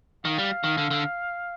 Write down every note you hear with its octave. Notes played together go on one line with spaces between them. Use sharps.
D#3 F5
G3
D#3
D3
D3